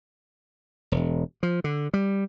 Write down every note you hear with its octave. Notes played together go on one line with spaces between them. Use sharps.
E1
F3
D3
G3